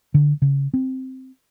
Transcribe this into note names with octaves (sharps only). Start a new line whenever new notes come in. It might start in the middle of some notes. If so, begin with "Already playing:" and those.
D3
C#3
C4